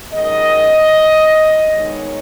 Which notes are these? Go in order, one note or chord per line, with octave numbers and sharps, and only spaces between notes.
F#2 D#3 G#3 D#5
D#3 G#3 B3 D#4 C#5